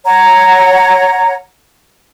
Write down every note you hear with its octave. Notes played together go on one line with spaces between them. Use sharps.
C#5 F#5 A#5